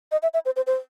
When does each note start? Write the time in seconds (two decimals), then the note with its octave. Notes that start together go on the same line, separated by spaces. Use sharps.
0.12 D#5
0.23 E5
0.34 E5
0.45 C5
0.56 C5
0.67 C5